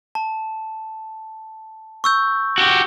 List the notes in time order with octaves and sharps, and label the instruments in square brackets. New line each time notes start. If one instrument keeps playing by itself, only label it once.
[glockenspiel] A5
C#6 E6 G6
[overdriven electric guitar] F#4 G4